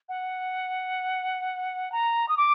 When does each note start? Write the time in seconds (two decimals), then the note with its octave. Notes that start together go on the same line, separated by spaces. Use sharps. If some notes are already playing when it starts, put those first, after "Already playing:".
0.09 F#5
1.92 A#5
2.29 D#6
2.37 D6